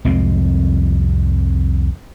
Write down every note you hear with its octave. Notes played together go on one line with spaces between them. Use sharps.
C2 F2 G#3 C4